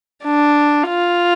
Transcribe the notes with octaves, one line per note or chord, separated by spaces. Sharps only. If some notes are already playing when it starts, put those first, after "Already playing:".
D4
F4